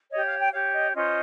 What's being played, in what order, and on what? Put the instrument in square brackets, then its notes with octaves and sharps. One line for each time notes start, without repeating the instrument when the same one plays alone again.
[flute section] G4 C#5 D#5
F5
G5
G4 C#5 F5
D#5
C#4 F4 C5 D#5